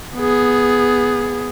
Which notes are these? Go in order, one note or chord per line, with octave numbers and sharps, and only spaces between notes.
B3 G#4